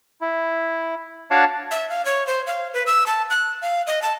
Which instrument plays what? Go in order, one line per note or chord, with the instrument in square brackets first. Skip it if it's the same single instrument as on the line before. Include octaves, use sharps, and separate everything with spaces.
[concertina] E4
D4 F#4 C#5 D5 F5 A5
[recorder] E5
F5
C#5
C5
F5
B4
E6
A5
F#6
F5
D#5
A5